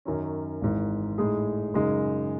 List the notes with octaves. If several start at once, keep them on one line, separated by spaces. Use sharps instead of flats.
F#2 D#3 F#3 C#4
G#1 G#2 E3
A2 G#3 D#4 G#4
F#2 C#3 G#3 D#4